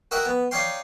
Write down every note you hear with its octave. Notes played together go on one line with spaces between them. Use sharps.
F#4 A#4 D#5 E5 F#5 G5
B3
D#4 C#5 D5 F5 G5 C6